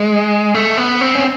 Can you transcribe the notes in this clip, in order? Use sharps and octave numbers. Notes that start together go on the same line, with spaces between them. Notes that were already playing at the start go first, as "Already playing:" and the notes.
Already playing: G#3
A3
B3
C4
C#4